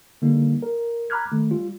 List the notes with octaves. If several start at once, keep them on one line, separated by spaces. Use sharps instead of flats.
D3 G3 A#3 D#4
A#4
A#5 B5 D6 F6 F#6 G#6
D#3 A3
G3 F4